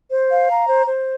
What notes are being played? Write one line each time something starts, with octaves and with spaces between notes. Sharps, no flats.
C5
F5
A#5
C5
C5